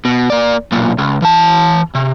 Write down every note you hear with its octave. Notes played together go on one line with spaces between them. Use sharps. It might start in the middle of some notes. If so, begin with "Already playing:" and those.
B2
A#3 D5
B1 A#2
C#2
E3 A5
C3